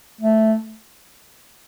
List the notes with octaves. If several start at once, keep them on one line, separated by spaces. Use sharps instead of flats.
A3